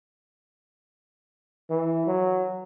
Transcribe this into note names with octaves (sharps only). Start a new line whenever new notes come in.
E3
F#3